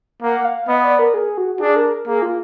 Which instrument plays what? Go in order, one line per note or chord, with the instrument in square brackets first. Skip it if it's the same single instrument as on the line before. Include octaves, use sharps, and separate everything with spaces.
[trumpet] A#3 [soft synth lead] F#5
[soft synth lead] F5
[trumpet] B3 [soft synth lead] D#5
[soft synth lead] D5
A#4
G#4
F#4
F#4
[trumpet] D4 [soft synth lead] G#4
[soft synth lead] A#4
[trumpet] A#3 [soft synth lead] G#4
[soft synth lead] F4